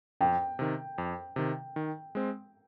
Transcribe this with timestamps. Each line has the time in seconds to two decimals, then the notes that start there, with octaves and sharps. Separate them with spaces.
0.21 F2 G5
0.59 C3 D#3
0.98 F2
1.36 C3 D#3
1.76 D#3
2.15 G#3 C4